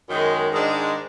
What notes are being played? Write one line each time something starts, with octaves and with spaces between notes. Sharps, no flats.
F#2 D#3 G#3
G#2 D#3 G#3 D4